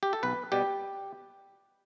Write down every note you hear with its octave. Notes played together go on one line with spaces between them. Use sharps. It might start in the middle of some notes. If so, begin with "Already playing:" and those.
G4
A4
B1 B4
B2 G3 G4